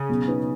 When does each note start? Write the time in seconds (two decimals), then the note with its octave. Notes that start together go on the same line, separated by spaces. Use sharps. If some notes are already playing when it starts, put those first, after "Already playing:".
Already playing: C#3
0.09 B1
0.27 B2 B3 D#4 B4